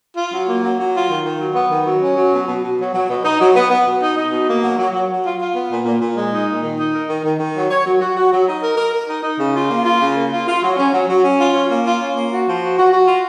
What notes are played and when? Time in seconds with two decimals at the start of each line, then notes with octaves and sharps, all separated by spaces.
0.16 F4
0.31 F#3
0.47 A#3
0.63 F#3
0.78 F#3
0.93 F4
1.09 D#3
1.24 D#3
1.39 F#3
1.55 B3
1.70 D#3
1.85 F#3
2.01 C#4
2.16 F#3
2.32 B2
2.47 B2
2.62 B2
2.78 F#3
2.93 F#3
3.08 B2
3.24 D#4
3.39 F#3
3.54 B3
3.70 B3
3.85 B2
4.00 D#4
4.16 D#4
4.31 B2
4.47 A#3
4.62 F#3
4.78 F#3
4.93 F#3
5.08 F#3
5.24 F4
5.39 F4
5.54 B3
5.70 A#2
5.85 A#2
6.00 A#2
6.16 G#3
6.31 D#4
6.46 A#2
6.62 D#3
6.77 D#4
6.92 A#4
7.08 D#3
7.23 D#3
7.39 D#3
7.54 F#3
7.70 C#5
7.85 F#3
8.01 F#4
8.16 F#4
8.31 F#3
8.46 D#4
8.62 A#4
8.77 A#4
8.92 A#4
9.08 D#4
9.23 D#4
9.39 C#3
9.54 F4
9.69 A#3
9.84 F4
10.00 C#3
10.16 A#3
10.31 F4
10.46 F4
10.62 F#3
10.76 C#4
10.92 F#3
11.08 F#3
11.23 C#4
11.38 F4
11.54 C#4
11.69 A#3
11.84 F4
12.00 C#4
12.15 A#3
12.30 F#4
12.46 F3
12.61 F#4
12.77 F#4
12.92 F#4
13.07 F4